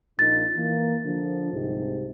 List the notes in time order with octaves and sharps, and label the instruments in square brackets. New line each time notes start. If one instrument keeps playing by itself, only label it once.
[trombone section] A#1 A#2 D#4 [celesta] A6
[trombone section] E3 A#3
D3 F3
C2 G#2 C3